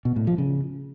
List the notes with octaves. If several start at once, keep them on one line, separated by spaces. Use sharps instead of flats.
B2
A2
F3
C#3